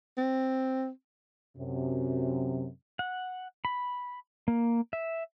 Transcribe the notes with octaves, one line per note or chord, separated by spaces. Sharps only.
C4
F#2 C3
F#5
B5
A#3
E5